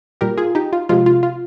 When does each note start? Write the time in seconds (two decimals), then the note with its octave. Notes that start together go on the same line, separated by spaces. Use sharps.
0.21 A#2 G3 G4 A#4
0.37 F4 G#4
0.55 D#4 G4
0.73 F4
0.89 C3 F3 G#3 F4
1.06 F4
1.23 F4